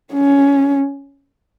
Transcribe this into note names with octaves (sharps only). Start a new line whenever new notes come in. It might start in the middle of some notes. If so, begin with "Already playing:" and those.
C#4